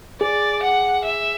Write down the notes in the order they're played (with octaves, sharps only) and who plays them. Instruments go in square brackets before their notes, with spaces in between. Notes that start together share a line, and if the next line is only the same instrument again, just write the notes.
[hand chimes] G#4 [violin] D5
[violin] F#5
E5